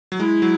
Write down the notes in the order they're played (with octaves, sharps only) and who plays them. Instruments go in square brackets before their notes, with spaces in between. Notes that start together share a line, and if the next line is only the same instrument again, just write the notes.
[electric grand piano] F#3
[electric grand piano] G#3 [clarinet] E4
[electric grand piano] F#3